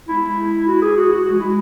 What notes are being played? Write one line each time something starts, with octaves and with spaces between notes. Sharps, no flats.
G#3 E4
F#4
G#4
F#4
F#4
G#3 F#4
E4